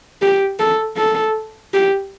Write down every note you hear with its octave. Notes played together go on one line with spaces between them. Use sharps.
G4
A4
A4
G4